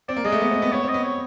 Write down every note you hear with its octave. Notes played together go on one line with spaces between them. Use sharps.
C4 D5
A#3
G#3 D#5
A3
B3
C4
B3
B3 C#5
C4
D#5
B3
C#5